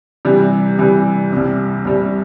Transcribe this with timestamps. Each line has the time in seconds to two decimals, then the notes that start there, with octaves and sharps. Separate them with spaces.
0.25 C3 E3 G3
0.79 C3 E3 G3
1.32 C2 C3 G3
1.85 C2 C3 G3